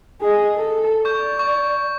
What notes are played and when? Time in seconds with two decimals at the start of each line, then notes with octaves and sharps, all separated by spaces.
0.21 G#4 D#5
0.56 A4
1.05 D5 C#6 G6
1.39 C#6